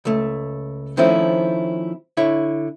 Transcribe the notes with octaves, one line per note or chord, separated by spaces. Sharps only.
C#2 A3
D#3 F3 A3 C4 C#4 E4
D3 E4 C#5